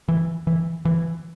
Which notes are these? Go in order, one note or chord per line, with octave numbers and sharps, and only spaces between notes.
E3
E3
E3